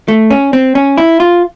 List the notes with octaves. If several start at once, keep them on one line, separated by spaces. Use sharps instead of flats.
A3
C#4
C4
C#4
E4
F4